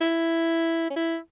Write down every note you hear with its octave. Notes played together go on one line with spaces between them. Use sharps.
E4
C#4
E4